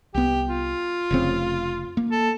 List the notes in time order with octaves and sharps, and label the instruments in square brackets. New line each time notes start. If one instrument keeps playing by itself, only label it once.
[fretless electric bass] C2 B3 [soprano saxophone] G4
[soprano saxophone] F4
[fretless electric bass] F1 C#3 C4
A#3
[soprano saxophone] A4